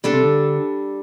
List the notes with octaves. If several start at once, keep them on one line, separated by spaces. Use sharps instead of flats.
B2 G3 D4 A4
C3
D3